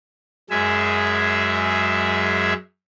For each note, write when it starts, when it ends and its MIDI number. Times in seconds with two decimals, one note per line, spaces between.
0.50 2.53 42
0.50 2.53 56
0.50 2.53 68
0.50 2.53 76